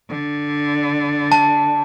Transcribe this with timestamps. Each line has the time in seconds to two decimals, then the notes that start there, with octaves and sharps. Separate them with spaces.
0.09 D3
1.32 A5